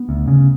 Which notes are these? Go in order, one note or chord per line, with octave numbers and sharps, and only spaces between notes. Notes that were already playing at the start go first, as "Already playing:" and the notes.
Already playing: B3
D2
C#3